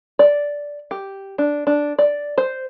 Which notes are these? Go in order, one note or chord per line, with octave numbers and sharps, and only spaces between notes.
D5
G4
D4
D4
D5
C5